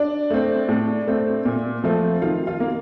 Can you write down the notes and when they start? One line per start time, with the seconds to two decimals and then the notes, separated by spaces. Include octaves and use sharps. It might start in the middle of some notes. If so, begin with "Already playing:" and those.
Already playing: D4 D5
0.30 A3 C4
0.68 A2
1.08 A3 C4
1.45 A#2
1.84 F3 A3 C4
2.22 D#3 F4 F5
2.47 F4 F5
2.60 A#3